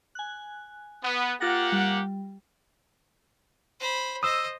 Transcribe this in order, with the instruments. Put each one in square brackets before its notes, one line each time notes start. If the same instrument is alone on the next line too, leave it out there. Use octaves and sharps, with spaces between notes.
[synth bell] G#5 F#6
[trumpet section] B3
[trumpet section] A#3 G4 F#5 [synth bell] F4 A6 A#6
[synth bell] G3
[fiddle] C5 B5
[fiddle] C5 D#5 [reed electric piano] D#6 E6